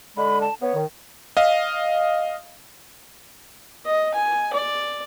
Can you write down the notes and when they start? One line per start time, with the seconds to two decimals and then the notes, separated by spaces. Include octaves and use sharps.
0.17 D3 G#3 B5
0.41 A5
0.62 B3 C#5
0.75 D#3
1.37 D#5 F5
3.86 D#5
4.14 G#5
4.53 D5